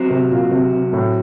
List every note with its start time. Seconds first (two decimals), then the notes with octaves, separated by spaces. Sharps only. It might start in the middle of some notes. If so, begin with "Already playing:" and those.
Already playing: F#3 C4 F#4 C5
0.10 C3
0.31 A#2
0.51 C3
0.72 C3
0.93 A2